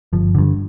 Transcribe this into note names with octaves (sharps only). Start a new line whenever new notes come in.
G1 F3
G2 D3